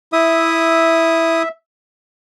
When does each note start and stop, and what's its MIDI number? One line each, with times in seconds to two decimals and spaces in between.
0.13 1.43 64
0.13 1.49 76
0.13 1.43 87